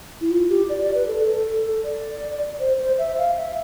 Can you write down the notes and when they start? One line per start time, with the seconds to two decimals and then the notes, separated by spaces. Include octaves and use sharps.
0.21 E4
0.31 F4
0.50 G4
0.69 D5
0.82 D5
0.95 B4
1.07 A4
1.26 A4
1.84 D5
2.60 C5
2.79 C5
2.98 E5
3.18 F5
3.37 E5